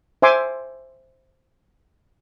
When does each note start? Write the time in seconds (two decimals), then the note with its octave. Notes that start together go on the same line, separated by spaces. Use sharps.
0.22 C5 E5 G#5 C6 D6